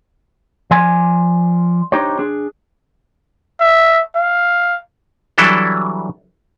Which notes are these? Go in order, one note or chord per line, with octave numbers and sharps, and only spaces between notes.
F3 D5 G#5 C6
D4 D#4 G4 C5 C#5
D4 G#4
E5
F5
E3 F#3 G3 D4 E4 A4